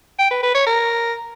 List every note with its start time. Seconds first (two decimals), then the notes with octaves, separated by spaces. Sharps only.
0.19 G5
0.31 B4
0.43 B4
0.55 C#5
0.67 A#4